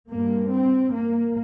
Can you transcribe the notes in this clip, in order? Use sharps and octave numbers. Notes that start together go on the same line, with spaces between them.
G2 A#3
C4
A#3